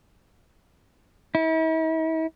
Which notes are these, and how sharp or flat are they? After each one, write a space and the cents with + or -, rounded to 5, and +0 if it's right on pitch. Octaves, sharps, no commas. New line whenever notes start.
E4 -45